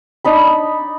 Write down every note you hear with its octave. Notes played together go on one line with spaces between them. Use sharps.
D4 D#4 B5